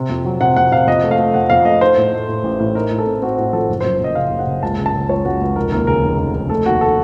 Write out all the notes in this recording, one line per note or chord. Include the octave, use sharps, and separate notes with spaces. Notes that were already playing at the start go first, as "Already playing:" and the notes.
Already playing: C3
F2
F#3
C3 F#5
F2 F#5
C3 F5
F2 D#5
A3
F5
A3
F2 F#5
F2 F5
A3 D#5
D#4 C5
A2
A3
A2
A1
A2
D#4 A#4
A2
A4
C4
C4 F#4
A2 F#4
F3 A4
F#1
F#2 C5
F#1 D#5
C#3 F5
F#1
F#5
C#3
C#2 A5
C#3
A5
C#3
C#2 C#5
C#2 F#4
C#2
F1 A#4
D#2 A#4
C#3 A#4
F1
F1
F1
A3 A4
D#2 F#4
A4